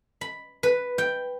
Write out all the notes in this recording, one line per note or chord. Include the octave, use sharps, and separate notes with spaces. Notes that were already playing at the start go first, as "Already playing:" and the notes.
B5
B4
G5